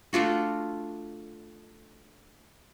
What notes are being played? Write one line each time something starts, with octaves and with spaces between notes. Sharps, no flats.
A3 D4 F4 F#4